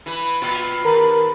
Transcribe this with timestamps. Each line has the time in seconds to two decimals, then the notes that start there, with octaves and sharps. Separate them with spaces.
0.06 E3 B4
0.42 A#2 F4 B4
0.85 D#2 A#4 B4